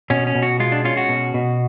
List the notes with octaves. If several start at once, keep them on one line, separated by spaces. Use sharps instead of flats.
B2 C#4
C#4
B2
F#4
G#3 F4
D4
C#4 F4
F#4
B2
B2